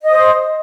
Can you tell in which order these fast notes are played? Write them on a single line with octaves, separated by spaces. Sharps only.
D#5 D#6 C5